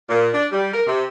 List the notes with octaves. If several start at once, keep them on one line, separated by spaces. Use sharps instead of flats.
A#2
D4
G3
A#4
C3